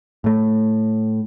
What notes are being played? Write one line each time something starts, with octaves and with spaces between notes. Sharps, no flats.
A2 A3